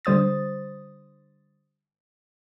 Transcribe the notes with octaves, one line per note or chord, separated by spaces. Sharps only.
D3 G3 C5 D#6 A6